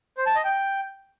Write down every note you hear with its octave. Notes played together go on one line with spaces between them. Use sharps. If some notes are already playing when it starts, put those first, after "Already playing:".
C5
A5
D#5
G5